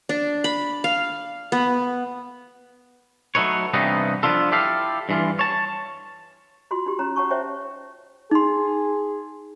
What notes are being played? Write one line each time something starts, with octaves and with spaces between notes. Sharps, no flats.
D4
B5
F5
B3
F#3 A3 D#4 B4 C#5
G2 C3 E3 B3 D#4
F3 A3 B3 D4 F4 A4
E4 G4 A4 F5
G2 E3 F4
C#5 A5
F4 F#4 D#5 C6
D#4 G4
C#4 C#5 A#5
C#5 F#5 A5 C#6
C5 C#5 D#5 E5 F#5 G5
D#4 G#4 C6